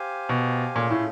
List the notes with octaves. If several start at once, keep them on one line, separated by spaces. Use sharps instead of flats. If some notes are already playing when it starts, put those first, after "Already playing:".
Already playing: G4 C5 F5 G#5
B2
A#2 A3 C#4 F4 G#4
A2